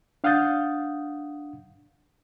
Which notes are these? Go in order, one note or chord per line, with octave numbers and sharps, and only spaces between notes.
D4 F5 F#5 D#6 G6 A6